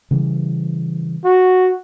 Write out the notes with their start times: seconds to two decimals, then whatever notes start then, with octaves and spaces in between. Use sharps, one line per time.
0.11 C#3 E3 G3
1.25 F#4